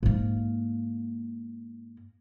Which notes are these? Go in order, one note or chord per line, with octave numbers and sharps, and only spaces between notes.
G#2 A#3